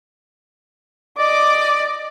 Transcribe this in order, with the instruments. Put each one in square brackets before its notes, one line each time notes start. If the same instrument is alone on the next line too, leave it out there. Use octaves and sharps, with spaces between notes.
[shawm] D5 [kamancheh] D#5 D6